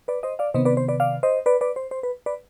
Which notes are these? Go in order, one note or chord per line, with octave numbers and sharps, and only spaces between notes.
B4 D5
C5 D#5
D5 F5
C3 D#3 B3 C5 D#5
B4 D5
C5
B4 D5
D5 F5
C5 D#5
B4 D5
B4 D5
C5
C5
B4
B4 D5